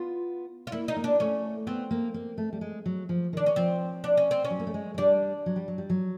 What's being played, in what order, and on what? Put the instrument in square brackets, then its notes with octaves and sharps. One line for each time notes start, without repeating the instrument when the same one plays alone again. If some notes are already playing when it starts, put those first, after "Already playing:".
Already playing: [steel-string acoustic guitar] B3 [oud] F4
[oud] F4
[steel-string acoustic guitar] A#3 [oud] E4
[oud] D#4
[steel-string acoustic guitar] A#3
[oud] D4
[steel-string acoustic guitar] A3 [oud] C#4
[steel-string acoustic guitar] B3 [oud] C4
[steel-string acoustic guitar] A#3
A#3
A3
G3
G#3
F#3
F3
[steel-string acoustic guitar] D#3 [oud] D4
[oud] C#4
[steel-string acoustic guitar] F3 [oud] C4
[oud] D4
C#4
C4
C#4
[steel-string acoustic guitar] F#3
A#3
A3
G#3
G#3
[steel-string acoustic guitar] G3 [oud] D4
[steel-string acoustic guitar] F#3
G3
F#3
G3
F#3